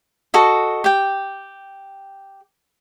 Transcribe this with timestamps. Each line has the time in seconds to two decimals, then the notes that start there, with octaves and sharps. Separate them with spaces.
0.34 F#4 A4 D#5
0.84 G4 G5